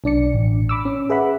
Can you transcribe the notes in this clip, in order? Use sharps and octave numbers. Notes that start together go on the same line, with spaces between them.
B1 D4 D5 C#7
A1
B5 D6 E6
C#4
G#4 B4 E5 F#5 B5